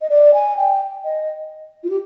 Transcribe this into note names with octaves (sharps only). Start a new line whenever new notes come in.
D#5
D5
G#5
G5
D#5
F4
G4